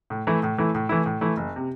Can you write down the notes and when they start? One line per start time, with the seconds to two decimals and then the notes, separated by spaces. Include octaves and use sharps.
0.10 A2
0.27 E3 A3 E4
0.43 A2
0.58 E3 A3 E4
0.75 A2
0.89 E3 A3 E4
1.06 A2
1.21 E3 A3 E4
1.37 F#1
1.56 C3